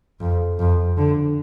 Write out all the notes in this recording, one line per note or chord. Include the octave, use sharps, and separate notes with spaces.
F2
F2
D3